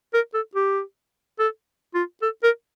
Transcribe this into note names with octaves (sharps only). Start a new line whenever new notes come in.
A#4
A4
G4
A4
F4
A4
A#4